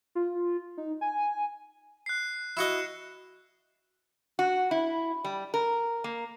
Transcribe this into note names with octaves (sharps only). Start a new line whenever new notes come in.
F4
D#4
G#5
F#6 C7
E4 F#4 D#5 F#6 C#7 E7
F#4
E4
G3
A#4
A#3